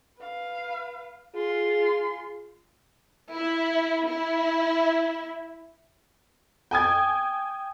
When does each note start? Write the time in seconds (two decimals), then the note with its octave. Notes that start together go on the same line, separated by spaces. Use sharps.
0.22 B4 F5
1.35 F4 G#4 C6
3.35 E4
4.10 E4
6.71 G5 G#5 D#6 G#6